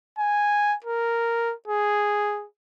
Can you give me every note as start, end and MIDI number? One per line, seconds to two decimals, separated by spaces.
0.18 0.75 80
0.84 1.54 70
1.68 2.45 68